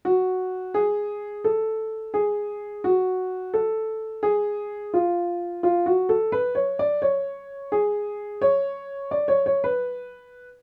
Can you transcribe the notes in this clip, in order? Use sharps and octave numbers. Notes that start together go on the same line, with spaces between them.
F#4
G#4
A4
G#4
F#4
A4
G#4
F4
F4
F#4
A4
B4
C#5
D5
C#5
G#4
C#5
D5
C#5
C#5
B4